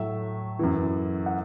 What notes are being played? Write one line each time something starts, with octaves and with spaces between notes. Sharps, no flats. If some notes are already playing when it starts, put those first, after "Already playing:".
Already playing: A2 F#3 E5
F#2 E3
F#5